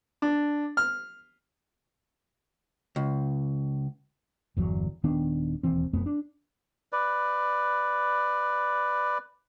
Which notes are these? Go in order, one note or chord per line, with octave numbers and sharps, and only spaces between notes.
D4
F6
C#2
G1 E2 F#3
D#1 D#3 B3 D4
E1 D#2 E3 C4
E1 F2 A3 B3
D4
B4 D5